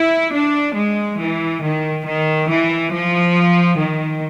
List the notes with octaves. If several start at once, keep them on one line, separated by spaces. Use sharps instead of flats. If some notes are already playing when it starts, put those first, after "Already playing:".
Already playing: E4
D4
G#3
E3
D#3
D#3
E3
F3
D#3